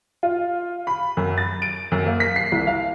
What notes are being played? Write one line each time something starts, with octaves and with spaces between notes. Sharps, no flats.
F4
B5
F#2
A6
D7
F#2
A#3
B6
C7
C2
F5